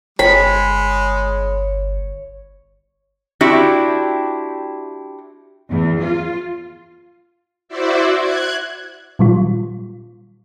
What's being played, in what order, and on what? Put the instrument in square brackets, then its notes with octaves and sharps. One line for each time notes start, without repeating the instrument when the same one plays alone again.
[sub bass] G1 [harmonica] G#3 [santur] C#5 [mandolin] B5
[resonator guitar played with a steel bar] C4 D4 E4 F#4 G4
[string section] E2
F4
[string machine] E4 F#4 C5 D5 E5
F#6 G#6
[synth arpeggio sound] A#2 D#3 F#3 G3 F4